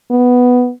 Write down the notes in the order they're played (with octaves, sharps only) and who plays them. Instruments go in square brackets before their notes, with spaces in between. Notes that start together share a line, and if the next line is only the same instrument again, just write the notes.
[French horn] B3